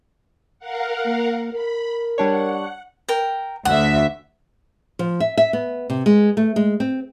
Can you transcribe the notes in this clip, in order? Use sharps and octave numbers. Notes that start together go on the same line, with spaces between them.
A#4 F5 F#5
A#3
A#4 B5
G3 D4 C#5 F#5
A#4 G5
D2 E5 F#5
F3
E5
E5
B3
C3
G#3
A3
G#3
C4